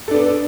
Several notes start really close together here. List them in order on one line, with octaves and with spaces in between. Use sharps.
A4 D4 B3